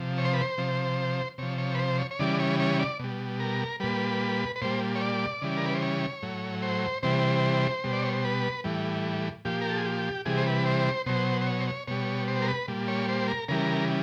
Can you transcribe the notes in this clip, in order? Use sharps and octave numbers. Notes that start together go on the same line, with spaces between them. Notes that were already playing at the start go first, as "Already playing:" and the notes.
Already playing: C3 F3
C#5
C5
B4
C5
C3 F3
C3 F3 C#5
C#5
B4
C5
C#5
C#5
C#3 E3 G3 D5
C#5
C#5
D5
B2 G3
A#4
A#2 G3 B4
B4
A#2 G3 C5
C#5
D5
C#3 E3 G3
A#4
B4
C5
C#5
A2 F#3
C5
C3 E3 G3 C5
B2 G3
D5
C#5
C5
B4
A2 E3 G3
A#2 F3 G4
A#4
A4
G#4
G4
C3 E3 G3 G#4
C5
B4
C5
B2 F#3 C5
C5
C#5
C5
C#5
B2 G3 C#5
C5
A#4
B4
A#2 G3
C#5
C5
A#4
C#3 E3 G3 A#4